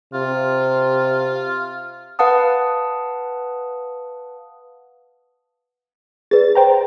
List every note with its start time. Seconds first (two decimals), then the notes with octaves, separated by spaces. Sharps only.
0.14 C3 F4
2.19 B4 F5 F#5 A5 D#6
6.31 G#4 B4 D5 A6
6.55 C5 G5 A#5